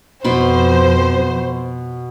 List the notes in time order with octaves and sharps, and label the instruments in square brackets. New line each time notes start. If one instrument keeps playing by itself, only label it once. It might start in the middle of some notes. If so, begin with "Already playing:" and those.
[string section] F2 C5 [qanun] B2 B5 C6